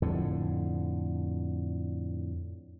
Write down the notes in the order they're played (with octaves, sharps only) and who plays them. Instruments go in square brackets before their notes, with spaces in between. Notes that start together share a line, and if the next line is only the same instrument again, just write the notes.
[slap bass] F2 A2 D3